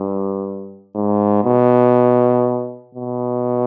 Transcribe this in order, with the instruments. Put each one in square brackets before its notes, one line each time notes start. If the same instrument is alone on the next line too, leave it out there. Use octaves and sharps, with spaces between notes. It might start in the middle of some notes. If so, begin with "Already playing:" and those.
Already playing: [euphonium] G2
G#2
B2
B2